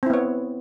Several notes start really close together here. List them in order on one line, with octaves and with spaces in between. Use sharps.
C4 E4 B3 C#5